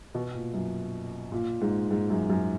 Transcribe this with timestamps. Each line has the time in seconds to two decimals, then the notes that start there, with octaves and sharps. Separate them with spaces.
0.14 B2
0.34 A#2
0.54 F#2
1.32 A#2
1.61 G#2
1.91 G#2
2.10 F#2
2.30 F#2